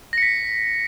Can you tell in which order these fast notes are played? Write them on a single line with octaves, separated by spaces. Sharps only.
A#6 C#7 B6